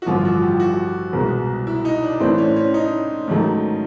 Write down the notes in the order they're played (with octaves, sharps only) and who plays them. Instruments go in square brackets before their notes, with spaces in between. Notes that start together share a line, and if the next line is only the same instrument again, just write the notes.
[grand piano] F#4
[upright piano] A1 G2 D3 F3 [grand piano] F4
[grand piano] F#4
G4
F#4
[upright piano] C2 B2 G#3
[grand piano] E4
D#4
D4
[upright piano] A2 E3 A3 C4 [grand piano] D4
[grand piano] C#4
C#4
D#4
[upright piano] G#2 D#3 F#3 A3